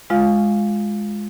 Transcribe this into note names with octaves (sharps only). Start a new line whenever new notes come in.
G#3 F4 F5